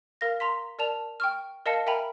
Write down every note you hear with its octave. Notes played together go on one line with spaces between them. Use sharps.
A#4 F5 A#6
A#5 C6 B6
A#4 D5 A5 F7
G5 C#6 F6
A#4 D#5 F5 A5 C#7
A#4 E5 G5 G#5 A#5 B5